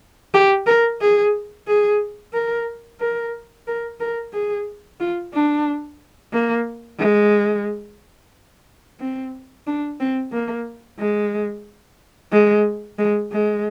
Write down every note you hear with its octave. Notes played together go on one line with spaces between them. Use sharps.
G4
A#4
G#4
G#4
A#4
A#4
A#4
A#4
G#4
F4
D4
A#3
G#3
C4
D4
C4
A#3
G#3
G#3
G#3
G#3